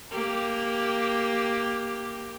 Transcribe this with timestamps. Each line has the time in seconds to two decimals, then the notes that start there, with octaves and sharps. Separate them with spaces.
0.11 A#3 G4